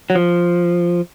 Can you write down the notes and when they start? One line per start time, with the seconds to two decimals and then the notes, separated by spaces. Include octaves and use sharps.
0.10 F#3
0.15 F3